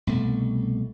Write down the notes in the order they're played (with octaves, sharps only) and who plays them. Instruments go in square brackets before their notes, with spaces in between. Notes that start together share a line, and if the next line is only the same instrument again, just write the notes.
[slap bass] C2 B2 A3